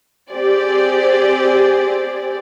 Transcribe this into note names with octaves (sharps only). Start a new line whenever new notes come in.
C4 G4 G#4 C5 D5